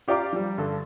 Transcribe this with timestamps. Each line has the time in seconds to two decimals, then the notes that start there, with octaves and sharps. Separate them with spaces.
0.08 F4 G4 D5 F5 A#5 D6
0.33 F3 G3
0.58 G2 D3 A4